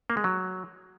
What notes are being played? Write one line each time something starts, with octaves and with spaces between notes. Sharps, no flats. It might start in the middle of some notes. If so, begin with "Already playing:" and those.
A#3
G#3
F#3